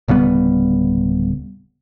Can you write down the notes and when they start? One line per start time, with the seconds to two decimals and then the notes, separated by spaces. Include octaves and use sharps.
0.08 D1 C#3 G3 B3